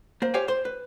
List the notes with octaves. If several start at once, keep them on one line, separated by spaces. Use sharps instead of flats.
A#3 C5
G4 C5 C#5 F5 G5 G#5
C5 C6
B4